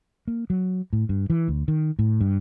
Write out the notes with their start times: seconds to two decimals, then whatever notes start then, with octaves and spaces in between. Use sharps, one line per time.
0.28 A#3
0.50 F#3
0.93 A2
1.09 G2
1.30 E3
1.48 D2
1.68 D#3
1.99 A2
2.21 G2